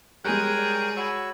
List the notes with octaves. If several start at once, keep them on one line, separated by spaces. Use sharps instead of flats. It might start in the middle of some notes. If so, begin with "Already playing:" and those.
G3 G#3 G#4 A#4 C#5 G5 F#6 G6
D5
F#4 C#5 B5 C#6 E6 G#6